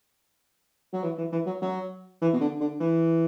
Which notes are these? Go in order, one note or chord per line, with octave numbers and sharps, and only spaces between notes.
F#3
E3
E3
E3
F#3
F#3
E3
B2
D3
D3
E3